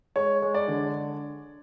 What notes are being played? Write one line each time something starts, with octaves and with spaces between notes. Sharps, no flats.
G#3 C#5
G#3
D5
D3